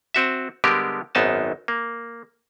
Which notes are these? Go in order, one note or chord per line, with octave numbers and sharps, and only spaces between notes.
C4 F#4 E5
D3 G3 G#3 B3 G4 A#4
G#1 F#2 B3 D#4 A5
A#3